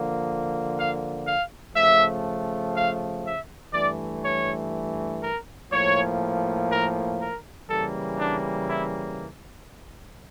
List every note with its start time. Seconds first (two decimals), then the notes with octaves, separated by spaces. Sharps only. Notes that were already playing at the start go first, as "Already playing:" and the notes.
Already playing: D3 F3 A#3
0.76 F5
1.26 F5
1.75 C#3 F3 A3 E5
2.75 F5
3.24 E5
3.73 G2 E3 A3 D5
4.23 C#5
5.22 A#4
5.71 A2 F3 A#3 C#5
6.70 A#4
7.20 A#4
7.69 C#3 E3 G3 A#3 A4
8.19 D4
8.68 E4